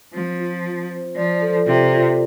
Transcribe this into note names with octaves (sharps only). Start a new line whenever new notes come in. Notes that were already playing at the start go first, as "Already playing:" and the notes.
F3 C4
F4
F4
C5
F3 D5
A4
C3 F4
F4